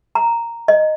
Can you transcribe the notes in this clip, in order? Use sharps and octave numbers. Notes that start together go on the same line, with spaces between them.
A#5
D#5